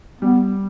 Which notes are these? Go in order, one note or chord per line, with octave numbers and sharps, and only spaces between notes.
G3 B3